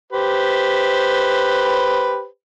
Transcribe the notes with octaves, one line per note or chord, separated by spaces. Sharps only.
G4 B4 C5